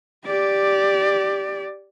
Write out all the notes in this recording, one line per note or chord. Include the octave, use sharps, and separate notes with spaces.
G4 D5